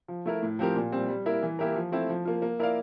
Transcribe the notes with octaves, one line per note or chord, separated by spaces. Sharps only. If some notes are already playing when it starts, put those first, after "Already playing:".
F3
A3 E4 A#4
A2
F3 C4 G4 A#4
A#2
G3 C4
G3
A#3 E4 A#4
E3
A#3 E4 G4 A#4
F3
A3 C4 E4
F3
A#3 F4
A#3
E4 A#4 D5 F5